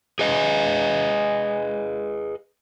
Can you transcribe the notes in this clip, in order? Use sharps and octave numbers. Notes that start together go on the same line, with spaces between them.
G#4 B4 D#5